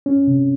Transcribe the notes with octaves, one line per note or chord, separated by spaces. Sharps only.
C#4
C3